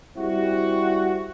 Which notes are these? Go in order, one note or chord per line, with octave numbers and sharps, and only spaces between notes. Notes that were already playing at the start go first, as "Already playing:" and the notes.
G3 C4 E4 F#4